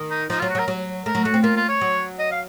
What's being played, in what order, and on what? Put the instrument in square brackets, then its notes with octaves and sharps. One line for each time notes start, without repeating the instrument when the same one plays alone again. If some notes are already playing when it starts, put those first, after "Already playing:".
Already playing: [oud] D#3
[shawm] D#4
[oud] F3 [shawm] D#4
[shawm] F4
[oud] F#3
[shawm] F#4
[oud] F#3
[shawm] A#4
[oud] F#3
[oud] A3 [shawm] A#4
[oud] F#3
[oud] A3 [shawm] F#4
[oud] C4
[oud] A#3 [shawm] F4
[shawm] F4
C#5
[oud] F#3
[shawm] D#5
F5